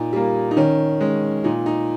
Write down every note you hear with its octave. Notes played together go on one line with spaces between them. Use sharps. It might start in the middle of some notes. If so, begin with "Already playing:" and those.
Already playing: A#2 D#4
G3 A#3
D#4
D#3 C#4
G#3 C#4
A#2 D#4
D#4